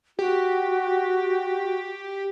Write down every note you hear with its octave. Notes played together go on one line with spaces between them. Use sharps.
F#4 G4